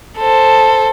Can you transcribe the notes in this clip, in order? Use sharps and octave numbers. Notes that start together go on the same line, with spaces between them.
A4 C5